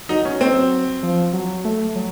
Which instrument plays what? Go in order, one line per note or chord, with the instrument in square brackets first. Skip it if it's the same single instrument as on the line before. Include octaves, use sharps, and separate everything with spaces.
[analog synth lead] F#3 [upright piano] D#4
[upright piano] C#4
[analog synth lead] F#3 [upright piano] C4
[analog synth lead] F3
F#3
A3
F#3